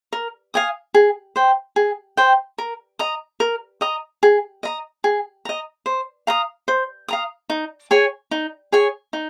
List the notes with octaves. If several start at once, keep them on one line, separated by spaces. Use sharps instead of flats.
A#4
F5 G#5 D#6
G#4
C5 G5
G#4
C5 G5
A#4
D#5 A#5 D#6
A#4
D#5 A#5 D#6
G#4
D#5 A#5
G#4
D#5 A#5
C5
F5 A#5 D#6
C5
F5 A#5 D#6
D#4
G#4 C#5 G#5
D#4
G#4 C#5 G#5
D#4